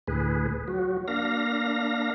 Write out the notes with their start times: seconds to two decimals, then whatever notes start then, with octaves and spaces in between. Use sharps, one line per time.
0.08 D2 A2 G#4 B4
0.68 F#3 F#4
1.08 A#3 D4 F5 A#6